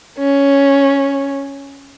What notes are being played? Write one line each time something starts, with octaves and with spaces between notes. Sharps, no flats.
C#4